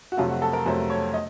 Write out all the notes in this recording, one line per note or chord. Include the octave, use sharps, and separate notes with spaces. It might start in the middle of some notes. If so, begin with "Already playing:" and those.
F#4
F2 C3 F#3 A3 F4
F#4
A4
A#4
F2 C3 F#3 A3 C5
C#5
D#5